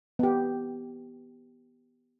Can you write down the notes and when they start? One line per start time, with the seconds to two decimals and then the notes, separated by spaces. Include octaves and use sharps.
0.19 B3 G4